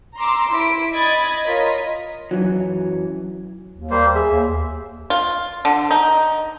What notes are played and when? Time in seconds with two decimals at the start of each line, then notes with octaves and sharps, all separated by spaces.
0.18 A#5 C6 D6 E6
0.51 E4 B6 D7
0.93 D#5 B5 G#6 A6
1.45 F4 A#4 C#5 D#5 B6
2.31 F#2 E3 F#3
3.76 D#2
3.90 G3 A#3 C5
4.15 G#4 E5
4.31 D#2
5.10 F4
5.65 D3
5.91 D#4